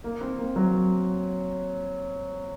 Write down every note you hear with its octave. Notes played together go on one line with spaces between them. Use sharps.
A#3
C4
A#3
F#3